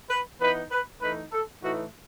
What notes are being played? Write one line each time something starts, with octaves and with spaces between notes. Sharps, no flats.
B4
E3 B3 D#4 B4
B4
E3 A3 D#4 B4
A4
A2 E3 A3 D#4 F#4